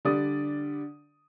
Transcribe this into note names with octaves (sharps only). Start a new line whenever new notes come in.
D3 G3 D5 D#6